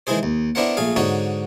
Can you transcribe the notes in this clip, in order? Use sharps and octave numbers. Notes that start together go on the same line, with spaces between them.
D#3 E3 G#3 E4 G#4 C5
D#2
B3 D4 E4 A#4 C5 F#5
A#1 A3 G#4 F5
G#2 D3 D#4 F#4 C#5